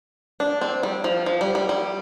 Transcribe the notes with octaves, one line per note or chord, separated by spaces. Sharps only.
D4
C4
G3
F3
F3
G3
G3
G3